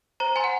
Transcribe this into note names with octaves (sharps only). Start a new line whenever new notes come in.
C5 A#5
G#5 C6
F#5